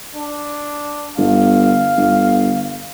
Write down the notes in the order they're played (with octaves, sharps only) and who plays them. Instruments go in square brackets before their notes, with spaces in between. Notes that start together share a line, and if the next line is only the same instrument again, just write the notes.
[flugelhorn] D4
[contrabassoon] G1 [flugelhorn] F5
[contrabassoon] G1